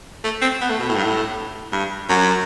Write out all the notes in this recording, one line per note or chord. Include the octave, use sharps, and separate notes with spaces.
A3
C4
B3
A3
B2
A2
G2
A2
G2
F#2